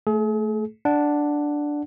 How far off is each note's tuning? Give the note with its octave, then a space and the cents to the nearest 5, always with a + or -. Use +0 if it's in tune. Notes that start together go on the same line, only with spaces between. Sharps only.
A3 +0 G#4 +40
D4 +0 F#5 +0